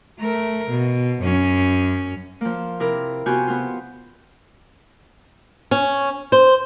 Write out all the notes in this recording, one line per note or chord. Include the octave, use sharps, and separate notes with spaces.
A3 A#4
B2
F#2 C#4
F3 A#3
C3 E4 A#4
C3 B3 F4 F#4 G#5 G6
B3 F4
C#4
C5